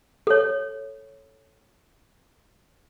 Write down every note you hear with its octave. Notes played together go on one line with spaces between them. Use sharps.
A4 C#5